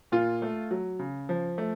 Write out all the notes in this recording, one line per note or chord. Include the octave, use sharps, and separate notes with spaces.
A#2 F4
A3
F#3
C#3
F3
A3